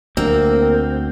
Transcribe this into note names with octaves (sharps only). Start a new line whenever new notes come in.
D2 A#3 C4